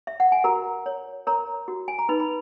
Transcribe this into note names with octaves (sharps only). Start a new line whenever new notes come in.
E5
F#5
G#5
F#4 A#4 A#5
C#5
A#4 C#5 A#5
F#4
G#5
A#5
D#4 B4 B5
B5